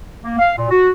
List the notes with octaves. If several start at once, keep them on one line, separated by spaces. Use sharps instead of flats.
A#3
F5
A#2
F#4